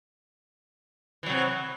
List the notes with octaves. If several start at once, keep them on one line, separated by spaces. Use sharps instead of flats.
C3 E3 F#3